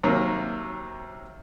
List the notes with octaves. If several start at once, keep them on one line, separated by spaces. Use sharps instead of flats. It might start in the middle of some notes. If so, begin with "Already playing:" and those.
D#2 C3 F#3 A#3